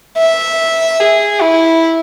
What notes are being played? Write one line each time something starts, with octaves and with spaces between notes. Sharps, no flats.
E5
G#4
E4